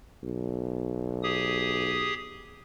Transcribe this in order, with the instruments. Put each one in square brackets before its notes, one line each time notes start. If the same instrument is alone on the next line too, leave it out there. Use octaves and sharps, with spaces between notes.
[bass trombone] B1
[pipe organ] G4 G#4 D#6